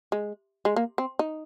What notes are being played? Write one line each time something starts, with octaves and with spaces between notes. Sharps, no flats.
G#3
G#3
A#3
C4
D#4